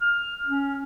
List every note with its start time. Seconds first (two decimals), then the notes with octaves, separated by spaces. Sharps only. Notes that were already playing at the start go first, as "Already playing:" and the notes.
0.01 F6
0.47 C#4